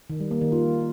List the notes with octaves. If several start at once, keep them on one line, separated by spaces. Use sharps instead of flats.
D#3
G3
A#3
D#3
F4